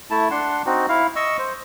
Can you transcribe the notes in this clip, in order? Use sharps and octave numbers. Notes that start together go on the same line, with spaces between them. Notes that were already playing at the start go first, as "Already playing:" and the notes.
A3 E4 A5
D4 F#5 C6
C4 D#4 F#4
E4 F5
D#5 C#6 E6
C5